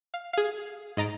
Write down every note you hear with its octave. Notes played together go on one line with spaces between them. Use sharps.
F5
G#4 F5
G#2 D#5 A#5 A6 D7